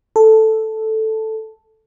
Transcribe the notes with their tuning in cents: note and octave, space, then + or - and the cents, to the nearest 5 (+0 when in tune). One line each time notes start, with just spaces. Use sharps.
A4 +0